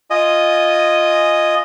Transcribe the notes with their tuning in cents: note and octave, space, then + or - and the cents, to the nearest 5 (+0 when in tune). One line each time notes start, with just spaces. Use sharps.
F4 +0 D#5 -5 G#5 +0